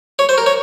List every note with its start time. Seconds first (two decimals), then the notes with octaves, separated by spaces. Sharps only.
0.19 C#5
0.29 C5
0.38 A#4
0.46 C#5